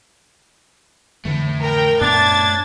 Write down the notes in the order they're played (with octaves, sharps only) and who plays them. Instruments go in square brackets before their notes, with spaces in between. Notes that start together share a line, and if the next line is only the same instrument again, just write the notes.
[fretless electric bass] F2 D3 E3 [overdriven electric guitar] A2 A3
[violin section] A#4 G5
[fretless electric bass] F#2 A#2 B3 [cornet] D4 [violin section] G#6 A6